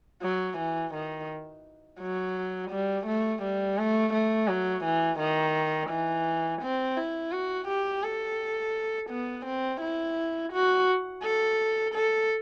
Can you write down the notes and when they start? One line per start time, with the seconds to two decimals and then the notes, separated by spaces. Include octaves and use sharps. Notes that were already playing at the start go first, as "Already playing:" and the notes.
0.22 F#3
0.58 E3
0.94 D#3
2.01 F#3
2.71 G3
3.07 A3
3.43 G3
3.78 A3
4.14 A3
4.48 F#3
4.85 E3
5.19 D#3
5.90 E3
6.62 C4
6.98 E4
7.32 F#4
7.68 G4
8.04 A4
9.10 B3
9.46 C4
9.81 E4
10.53 F#4
11.24 A4
11.94 A4